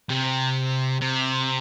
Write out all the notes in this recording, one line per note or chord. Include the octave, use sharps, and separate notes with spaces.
C3
C3